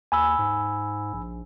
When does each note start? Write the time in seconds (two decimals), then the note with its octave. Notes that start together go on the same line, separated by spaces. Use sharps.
0.12 D#2 G#5 B5 E6
0.39 G#2
1.13 A#1